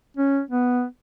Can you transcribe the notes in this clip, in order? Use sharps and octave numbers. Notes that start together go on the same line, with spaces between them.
C#4
B3